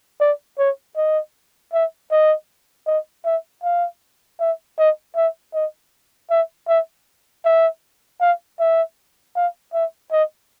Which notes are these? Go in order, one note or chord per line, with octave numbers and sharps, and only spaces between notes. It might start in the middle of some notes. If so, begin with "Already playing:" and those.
D5
C#5
D#5
E5
D#5
D#5
E5
F5
E5
D#5
E5
D#5
E5
E5
E5
F5
E5
F5
E5
D#5